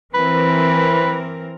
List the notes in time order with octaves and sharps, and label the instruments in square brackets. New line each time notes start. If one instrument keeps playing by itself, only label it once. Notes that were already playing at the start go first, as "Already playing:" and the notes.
[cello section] E3 C4 A#4 [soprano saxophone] B4